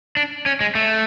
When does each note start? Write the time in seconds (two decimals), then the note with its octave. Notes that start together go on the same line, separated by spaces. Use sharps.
0.17 D4
0.46 C#4
0.61 G#3
0.75 A3